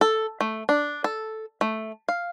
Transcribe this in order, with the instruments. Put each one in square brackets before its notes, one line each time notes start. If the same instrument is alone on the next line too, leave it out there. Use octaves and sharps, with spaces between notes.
[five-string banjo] A4
A3
D4
A4
A3
F5